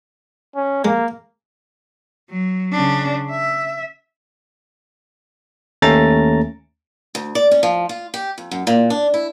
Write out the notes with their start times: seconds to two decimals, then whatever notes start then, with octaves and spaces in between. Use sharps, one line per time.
0.56 C#4
0.85 G#3 A#3
2.30 F#3
2.73 C#3 D4
3.31 E5
5.82 D#2 A3 C#4 A#5 A6
7.15 D2
7.35 D5
7.51 C#4
7.63 F3
7.89 F4
8.14 G4
8.38 F2
8.51 F#2
8.67 A#2
8.90 D4
9.14 E4